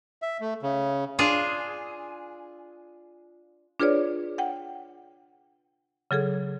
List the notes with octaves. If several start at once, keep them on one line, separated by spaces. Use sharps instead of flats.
E5
A3
C#3
D4 F4 G#4
D4 F4 G#4 B4 C#5 D5
F#5 G5
C#3 F#3 G#4 A4